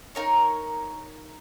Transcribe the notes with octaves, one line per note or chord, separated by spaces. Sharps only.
D#4 A#4 C#5